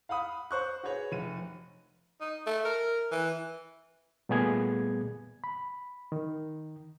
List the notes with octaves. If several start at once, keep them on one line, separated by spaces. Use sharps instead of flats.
F5 F#5 B5 D#6
C5 C#6 F#6
F#4 G#4 B4 C#5
F1 D#7
D#4
A3
A#4
E3
A#2 G3 A3 B3 G#4 G#6
B5
D#3